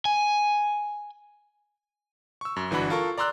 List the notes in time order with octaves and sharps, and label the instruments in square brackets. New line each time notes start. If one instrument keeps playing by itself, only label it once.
[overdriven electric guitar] G#5
[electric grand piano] C#6 E6
F#2
G1 E3 D4 F#4 B5
F4 A4 A#4 C#6
D5 A#5 C6 E6 F#6